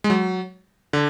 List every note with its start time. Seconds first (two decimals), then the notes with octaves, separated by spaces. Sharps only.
0.04 G#3
0.10 F#3
0.93 D3